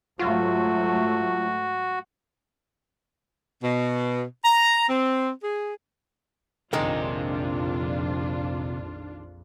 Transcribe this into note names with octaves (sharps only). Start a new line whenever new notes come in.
G#2 F#3 A3 F4 F#4
B2
A#5
C4
G#4
A#1 F2 C3 D#3 G#3 D4 D#4 F4